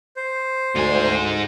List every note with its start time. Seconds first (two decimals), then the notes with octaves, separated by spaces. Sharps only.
0.17 C5
0.76 D2 G#2 G#5